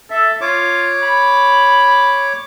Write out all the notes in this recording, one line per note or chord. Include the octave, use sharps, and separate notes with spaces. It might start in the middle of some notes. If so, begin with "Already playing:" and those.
A4 E5
F4 C#5 D6
B5